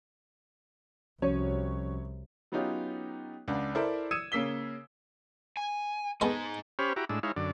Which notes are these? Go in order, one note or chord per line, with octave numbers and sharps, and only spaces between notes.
C2 F3 C#4 F#4 C#5
F#3 B3 C#4 D#4 F4 G4
C#2 D4 F#5
E4 A4 A#4 C5 D5 E5
D#6 E6 G#6 C#7 D#7 E7
C#3 A#3 E6 B6 G7
G#5
G#3 B3 D#4 G#4 A4
C#4 G4 C5 C#5 B5 F6
E4 F#4 G4 A#5 D6
A2 G#3 D4 E6
G#3 D#4 E4 C#5 F5
F#2 D3 D5